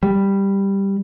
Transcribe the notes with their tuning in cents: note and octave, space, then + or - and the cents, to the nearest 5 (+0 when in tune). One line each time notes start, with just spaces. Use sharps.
G3 +5